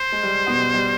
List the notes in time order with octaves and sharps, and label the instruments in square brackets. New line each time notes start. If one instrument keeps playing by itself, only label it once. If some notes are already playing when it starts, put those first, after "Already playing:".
Already playing: [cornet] C5
[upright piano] G#3
G3
B2 B3
G3
G3